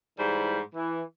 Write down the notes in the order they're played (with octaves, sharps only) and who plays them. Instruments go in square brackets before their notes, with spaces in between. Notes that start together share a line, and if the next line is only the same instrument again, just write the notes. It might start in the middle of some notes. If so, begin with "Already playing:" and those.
[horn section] G#2 E3 G3 E4 C5 B5
E3